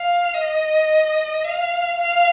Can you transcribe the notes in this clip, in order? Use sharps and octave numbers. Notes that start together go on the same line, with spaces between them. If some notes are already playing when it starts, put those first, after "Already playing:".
Already playing: F5
D#5
F5
F5